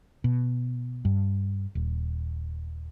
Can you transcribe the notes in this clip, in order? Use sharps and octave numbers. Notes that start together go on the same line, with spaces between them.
B2
G2
D#1